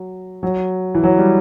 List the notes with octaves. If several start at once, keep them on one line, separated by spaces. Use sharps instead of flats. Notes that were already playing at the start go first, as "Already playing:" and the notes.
Already playing: F#3
F#3
E3
F#3
G3